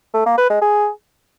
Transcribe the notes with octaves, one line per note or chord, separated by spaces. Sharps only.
A3
A#3
B4
G#3
G#4